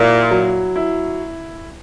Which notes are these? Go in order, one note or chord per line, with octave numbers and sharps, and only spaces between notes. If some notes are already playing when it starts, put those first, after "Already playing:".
Already playing: A#2 F#3 E4
F#3
E4